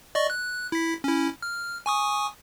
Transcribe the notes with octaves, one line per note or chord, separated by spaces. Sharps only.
D5 D#5 C#6
F#6
E4 B6
C#4 E4
F6
G#5 C#6 D#6